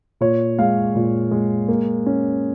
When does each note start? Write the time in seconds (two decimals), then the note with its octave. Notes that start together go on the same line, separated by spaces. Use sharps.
0.21 A#2 C#5
0.59 G#3 F5
0.96 A#2
1.31 G#3
1.68 A#3
2.06 C#4